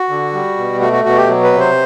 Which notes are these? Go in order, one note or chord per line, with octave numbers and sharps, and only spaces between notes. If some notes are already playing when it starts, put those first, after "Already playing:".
Already playing: F#4
D3
G3
B2
A3 F#4
F#4
B2 F#4
G4
F#3
B4
C3
C5